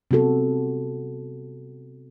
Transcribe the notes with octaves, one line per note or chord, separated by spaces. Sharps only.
C3 B3 F#4 A4